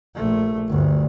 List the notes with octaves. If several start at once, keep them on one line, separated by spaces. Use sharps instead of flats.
A#1 A3
G1 D2